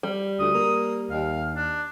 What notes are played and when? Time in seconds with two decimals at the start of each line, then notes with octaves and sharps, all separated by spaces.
0.03 G3
0.40 D2 D#6
0.54 A#3
1.11 D#2 F5
1.56 D4